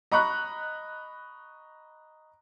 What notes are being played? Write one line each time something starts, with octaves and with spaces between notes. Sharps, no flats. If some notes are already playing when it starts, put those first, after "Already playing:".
D#5 A#5 B5 C#6 F#6